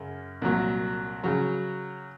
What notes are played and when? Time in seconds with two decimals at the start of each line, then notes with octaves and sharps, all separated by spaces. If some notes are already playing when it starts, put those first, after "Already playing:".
Already playing: F#2 C#3
0.42 C2 A#2 F#3
1.24 C#3 F#3